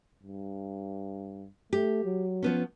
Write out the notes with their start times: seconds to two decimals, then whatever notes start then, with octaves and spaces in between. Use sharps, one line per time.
0.23 G2
1.73 A3 G4
2.05 F#3
2.43 F3 B3 C#4